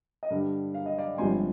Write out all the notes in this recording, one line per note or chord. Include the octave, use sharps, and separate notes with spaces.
D#5
G2 D3 G3 D5
F5
D#5
D5 F5
G1 G2 F3 G#3 C4 G#5 C6